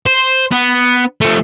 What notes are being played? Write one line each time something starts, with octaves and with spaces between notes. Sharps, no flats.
C5
B3
F3 A3